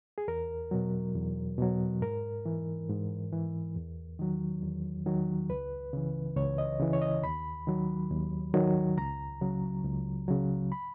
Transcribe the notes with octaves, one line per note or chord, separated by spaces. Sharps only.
G#4
E2 A#4
B2 F#3
E2
B2 F#3
G#2 A#4
E3
G#2
E3
E2
D#3 F#3
E2
D#3 F#3
C#2 B4
C#3 E3
C#2 C#5
D#5
C#3 E3
C#5
D#5
D#2 B5
D#3 F#3
D#2
D#3 F#3
C#2 A#5
C#3 F#3
C#2
C#3 F#3
B5